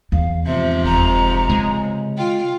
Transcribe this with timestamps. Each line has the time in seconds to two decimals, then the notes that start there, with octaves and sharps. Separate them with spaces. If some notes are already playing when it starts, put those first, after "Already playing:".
0.12 E2 F5
0.46 G#2 C3 F3 E5
0.85 F1 A#5
1.49 C#3 G#3
2.17 F4 G5